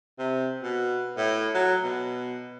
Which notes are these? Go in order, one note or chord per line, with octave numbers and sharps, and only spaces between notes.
C3
B2
A2
F#3
B2